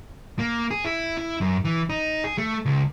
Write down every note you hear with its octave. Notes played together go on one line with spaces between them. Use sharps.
A#3
G#4
E4
E4
F#2
E3
D#4
G#4
A3
C#2